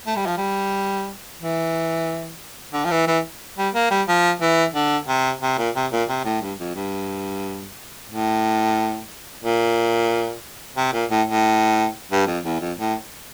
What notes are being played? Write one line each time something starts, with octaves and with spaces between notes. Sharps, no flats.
A3
G3
F3
G3
E3
D3
F3
E3
E3
G3
A#3
G3
F3
E3
D3
C3
C3
A#2
C3
A#2
C3
A2
G2
F2
G2
A2
A#2
C3
A#2
A2
A2
G2
F2
E2
F2
A2